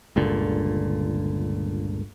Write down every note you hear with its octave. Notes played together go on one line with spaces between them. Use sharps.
G1 C#2 A#2 D3